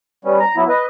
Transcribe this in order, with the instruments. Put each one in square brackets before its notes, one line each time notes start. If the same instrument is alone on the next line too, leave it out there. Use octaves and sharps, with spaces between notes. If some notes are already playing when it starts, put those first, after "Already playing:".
[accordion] G3 B3 C#4
A#5
F#3 B3 E4
B4 D#5